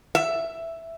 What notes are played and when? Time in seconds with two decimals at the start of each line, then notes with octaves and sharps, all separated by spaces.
0.15 E5